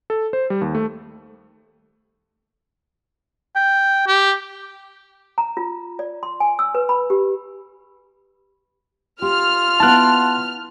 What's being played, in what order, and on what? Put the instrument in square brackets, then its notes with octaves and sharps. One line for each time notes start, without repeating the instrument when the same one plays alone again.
[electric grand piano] A4
C5
G3
D#2
A3
[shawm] G5
G4
[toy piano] A#5
F4
D5
C6
G#5
E6
B4
B5
G4
[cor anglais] F4 [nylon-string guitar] G4 [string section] F6
[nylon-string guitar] B3 E4 [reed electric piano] A5 F#6